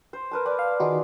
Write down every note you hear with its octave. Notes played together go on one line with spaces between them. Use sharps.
C5
A#4 B4 A5
B4 D5 B5
F5
D#3 D#4 F4 F#4 G#4